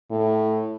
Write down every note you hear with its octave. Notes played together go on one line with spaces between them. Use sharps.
A2